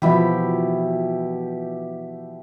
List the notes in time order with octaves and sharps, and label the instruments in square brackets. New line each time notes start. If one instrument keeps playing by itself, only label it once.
[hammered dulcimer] B2 E4 G4 [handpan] E3 F3